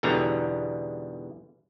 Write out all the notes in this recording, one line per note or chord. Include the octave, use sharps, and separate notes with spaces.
E2 G#2 B2 D3 G3 A#5